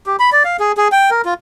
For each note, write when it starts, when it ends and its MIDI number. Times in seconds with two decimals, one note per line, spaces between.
0.06 0.16 67
0.19 0.30 83
0.32 0.43 74
0.44 0.57 77
0.60 0.72 68
0.77 0.88 68
0.92 1.10 79
1.11 1.22 70
1.25 1.34 65